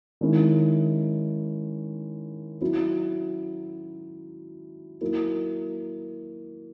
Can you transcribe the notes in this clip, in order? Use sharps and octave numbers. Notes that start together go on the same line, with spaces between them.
D#3 G#3 C#4 E4
F#3 C#4 E4
F#3 A#3 E4